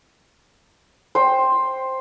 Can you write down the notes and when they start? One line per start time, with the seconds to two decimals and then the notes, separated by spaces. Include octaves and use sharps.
1.15 C5 G5